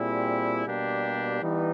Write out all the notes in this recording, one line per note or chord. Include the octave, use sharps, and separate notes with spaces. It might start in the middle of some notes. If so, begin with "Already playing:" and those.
Already playing: A#2 G3 C4 E4 G#4
B2 G3 A#3 D4 G4
E3 G3 B3 D#4